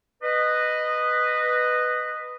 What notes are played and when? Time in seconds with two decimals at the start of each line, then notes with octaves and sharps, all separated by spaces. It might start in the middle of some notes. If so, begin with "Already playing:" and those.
0.23 B4 D#5